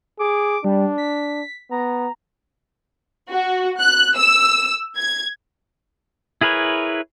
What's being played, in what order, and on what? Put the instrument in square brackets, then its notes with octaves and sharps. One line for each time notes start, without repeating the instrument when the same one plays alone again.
[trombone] G#4 [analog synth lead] D6
[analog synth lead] G3 [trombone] D4
[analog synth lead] B6
[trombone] B3 [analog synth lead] A#5
[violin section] F#4
F#6
E6
G#6
[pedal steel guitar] E4 G#4 A#4 B4 C#5